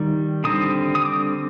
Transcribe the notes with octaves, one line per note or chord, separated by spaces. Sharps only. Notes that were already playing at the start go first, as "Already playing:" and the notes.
Already playing: D#3 G3
D3 G3 C4 D#6
D#6
D6